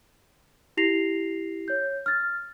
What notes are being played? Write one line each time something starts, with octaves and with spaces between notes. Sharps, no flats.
E4 G4 A#6 C7 F7
C#5 G6
F6 A6